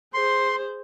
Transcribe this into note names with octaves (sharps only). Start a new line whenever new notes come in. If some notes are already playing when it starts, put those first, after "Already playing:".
G#4 C5 C6